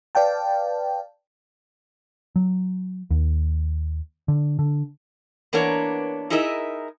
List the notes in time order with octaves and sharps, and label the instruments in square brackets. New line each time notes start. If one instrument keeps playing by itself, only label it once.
[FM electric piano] B4 D5 F5 G5 A5
[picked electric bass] F#3
D#2
D3
D3
[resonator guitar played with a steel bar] E3 A#3 B3 D4 A#4 C#5
D#4 E4 G#4 A#4 D#5 E5